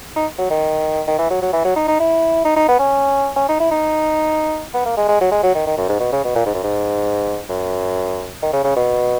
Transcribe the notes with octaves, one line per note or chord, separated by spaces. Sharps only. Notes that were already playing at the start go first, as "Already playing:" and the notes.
D#4
F#3
D#3
D#3
E3
F#3
F#3
E3
F#3
D#4
D#4
E4
D#4
D#4
B3
C#4
C#4
D#4
E4
D#4
B3
A#3
G#3
G#3
F#3
G#3
F#3
D#3
D#3
F#2
G#2
B2
C#3
B2
A#2
G#2
F#2
G#2
F#2
D#3
C#3
C#3
B2